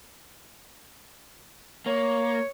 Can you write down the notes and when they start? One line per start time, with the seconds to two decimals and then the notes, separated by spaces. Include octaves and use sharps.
1.86 A#3 C#5